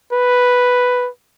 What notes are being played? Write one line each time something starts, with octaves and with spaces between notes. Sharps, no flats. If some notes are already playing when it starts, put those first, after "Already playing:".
B4